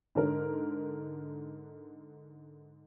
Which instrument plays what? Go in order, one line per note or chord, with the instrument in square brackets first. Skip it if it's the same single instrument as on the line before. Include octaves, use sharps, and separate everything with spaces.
[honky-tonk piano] G#2 D3 A#4